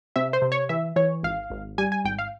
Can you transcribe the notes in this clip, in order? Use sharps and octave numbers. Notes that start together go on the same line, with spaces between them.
C3 E5
C5
C3
C#5
E3 E5
E3 C#5
G#1 F5
G#1
G3 G#5
G#5
G#1 G5
F5